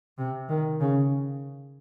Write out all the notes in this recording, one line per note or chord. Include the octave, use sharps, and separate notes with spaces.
C3
D#3
C#3